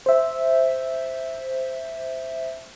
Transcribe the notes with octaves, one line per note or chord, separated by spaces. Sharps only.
C5 E5